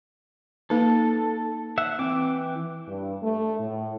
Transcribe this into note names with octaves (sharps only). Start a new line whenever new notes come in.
A#3 D#4 A4 B4
E5 F#5
E3 C4 G5 D6
G2
A3
A2